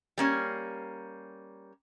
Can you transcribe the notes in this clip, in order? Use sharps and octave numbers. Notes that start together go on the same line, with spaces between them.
G3 A#3 C#4